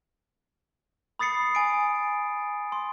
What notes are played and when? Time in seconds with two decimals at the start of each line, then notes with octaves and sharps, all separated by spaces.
1.19 B5 D#6 A6 C7 C#7
1.55 G#5 D7
2.72 C6